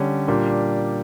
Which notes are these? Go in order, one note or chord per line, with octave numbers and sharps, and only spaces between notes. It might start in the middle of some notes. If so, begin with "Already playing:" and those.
Already playing: D3 G3 C#4
A#2 G3 A#3 D4